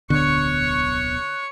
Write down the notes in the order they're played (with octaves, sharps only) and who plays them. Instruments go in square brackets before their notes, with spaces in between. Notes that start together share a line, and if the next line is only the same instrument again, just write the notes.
[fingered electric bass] D1 B1 B3 [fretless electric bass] D3 [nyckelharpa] C#5 C#6 [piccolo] F#6